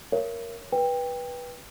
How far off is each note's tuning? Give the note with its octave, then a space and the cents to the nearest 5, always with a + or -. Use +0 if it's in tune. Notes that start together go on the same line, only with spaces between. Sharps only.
A#4 +0 C#5 +0 E5 +45
B4 -15 G5 +20